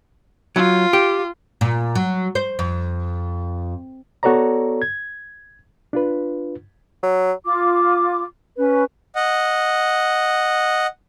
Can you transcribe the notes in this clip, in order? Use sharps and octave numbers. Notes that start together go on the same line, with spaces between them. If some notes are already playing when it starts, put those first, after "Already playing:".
F#3 F4
G4
A#2
F#3
C5
F2
B3 F#4 A4 C#5 D5 A#5
G#6
D4 F4 B4
F#3
F4 D6
C#4 B4
D#5 F#5